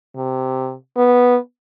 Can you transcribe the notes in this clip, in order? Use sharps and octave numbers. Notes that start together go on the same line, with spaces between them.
C3
B3